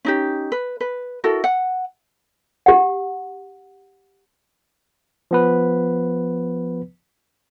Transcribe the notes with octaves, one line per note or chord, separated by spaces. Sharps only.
C#4 D#4 G4
B4
B4
E4 F#4 A4 A#4
F#5
G4 F#5
F3 B3 B4